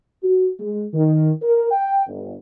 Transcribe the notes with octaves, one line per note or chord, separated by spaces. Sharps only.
F#4
G#3
D#3
A#4
G5
G1